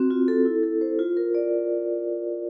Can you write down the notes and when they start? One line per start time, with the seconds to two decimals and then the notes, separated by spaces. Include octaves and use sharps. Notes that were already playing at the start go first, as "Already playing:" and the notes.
Already playing: C4 F#4
0.11 F4
0.28 A4
0.45 E4
0.63 A4
0.81 C5
0.99 F4
1.17 A#4
1.35 D5